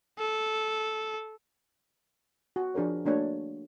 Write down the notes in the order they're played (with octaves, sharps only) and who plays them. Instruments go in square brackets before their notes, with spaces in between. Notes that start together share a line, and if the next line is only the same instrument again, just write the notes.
[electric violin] A4
[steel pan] F#4
F3 D4 G#4 A#4 C#5
A3 A#3 D4 F#4 C#5